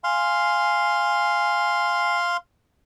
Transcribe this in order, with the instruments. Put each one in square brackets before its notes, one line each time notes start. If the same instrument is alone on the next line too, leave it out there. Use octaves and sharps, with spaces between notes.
[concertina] F5 C6 [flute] G#5